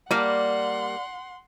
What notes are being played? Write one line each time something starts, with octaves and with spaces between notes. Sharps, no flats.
G3 A#3 D5 F#5 C6